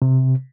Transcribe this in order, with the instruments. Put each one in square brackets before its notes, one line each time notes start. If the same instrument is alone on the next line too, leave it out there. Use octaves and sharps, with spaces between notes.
[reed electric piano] C3